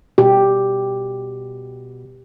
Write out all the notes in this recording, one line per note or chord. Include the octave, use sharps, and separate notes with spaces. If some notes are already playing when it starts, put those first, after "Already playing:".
B2 G4